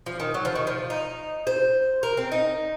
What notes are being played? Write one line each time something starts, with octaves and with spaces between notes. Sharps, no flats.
F3
D#3
F#3
F3
D#3
F3
D#4
C5
A#4
C4
D#4